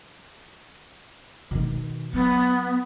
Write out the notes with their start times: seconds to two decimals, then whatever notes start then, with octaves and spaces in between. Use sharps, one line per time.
1.51 B2 D#3
2.14 F#3 B3